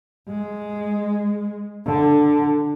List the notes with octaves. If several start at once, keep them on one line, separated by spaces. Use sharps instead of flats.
G#3
D3